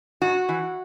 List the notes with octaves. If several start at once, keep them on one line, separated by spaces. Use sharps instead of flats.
G#2 F#4
E3